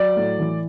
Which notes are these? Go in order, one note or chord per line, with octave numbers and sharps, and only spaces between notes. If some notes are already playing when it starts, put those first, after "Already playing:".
Already playing: F#3 D5
A2
E3